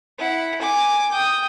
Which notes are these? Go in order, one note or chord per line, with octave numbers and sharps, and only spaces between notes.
E4 F#5
G#5 D6
G5 D#6